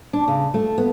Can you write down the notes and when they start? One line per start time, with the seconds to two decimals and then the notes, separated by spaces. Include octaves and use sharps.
0.13 D4
0.28 C#3
0.54 A3
0.78 B3